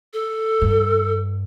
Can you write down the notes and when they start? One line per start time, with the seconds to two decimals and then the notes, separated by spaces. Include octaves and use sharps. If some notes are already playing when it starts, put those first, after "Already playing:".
0.13 A4
0.61 G2